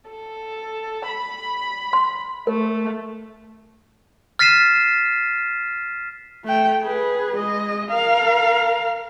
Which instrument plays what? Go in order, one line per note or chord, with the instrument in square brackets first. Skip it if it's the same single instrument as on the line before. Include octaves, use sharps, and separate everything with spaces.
[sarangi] A4
B5
[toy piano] C6
[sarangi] A3 [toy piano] A#4
[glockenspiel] F6 A6 B6 C7 D#7 E7
[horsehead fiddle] A3 G5
G#4 B4
G#3 D#5
A#4 F5